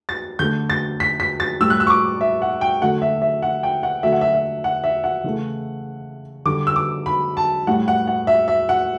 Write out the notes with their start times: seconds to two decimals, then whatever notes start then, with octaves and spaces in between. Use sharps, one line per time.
0.09 A6
0.39 D3 A3 G6
0.70 A6
1.00 B6
1.20 B6
1.40 A6
1.60 A2 G3 E6
1.70 F#6
1.80 E6
1.87 C#6
1.90 D6
2.21 E5
2.42 F#5
2.61 G5
2.82 D3 F#3 A3 F#5
3.02 E5
3.22 E5
3.42 F#5
3.63 G5
3.83 F#5
4.03 D3 F#3 A3 E5
4.12 F#5
4.21 E5
4.33 E5
4.64 F#5
4.84 E5
5.04 F#5
5.24 C#3 E3 A3
6.45 D3 G3 D6
6.67 E6
6.76 D6
7.06 B5
7.37 A5
7.67 A2 G3 F#5
7.88 F#5
8.08 F#5
8.27 E5
8.48 E5
8.69 F#5